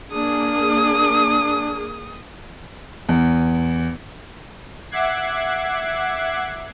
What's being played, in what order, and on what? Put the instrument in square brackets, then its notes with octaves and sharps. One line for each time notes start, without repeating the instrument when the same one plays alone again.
[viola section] A#3 G#4 [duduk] D4 [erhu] D#6
[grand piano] E2
[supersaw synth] E5 F#5 D6 F#6 G#6 C7